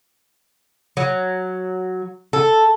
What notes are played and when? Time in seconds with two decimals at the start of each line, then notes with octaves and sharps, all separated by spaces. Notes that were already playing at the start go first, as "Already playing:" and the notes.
0.97 F#3
2.33 A4